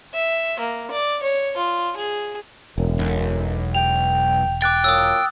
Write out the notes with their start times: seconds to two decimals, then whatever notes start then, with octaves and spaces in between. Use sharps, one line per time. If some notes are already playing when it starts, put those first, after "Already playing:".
0.14 E5
0.59 A#3
0.91 D5
1.22 C#5
1.57 F4
1.97 G#4
2.78 E1 F#2
2.99 B1
3.75 G5 F7
4.62 G5 D6 F#6 A6
4.84 A#2 F#3 A#3 D#6 E6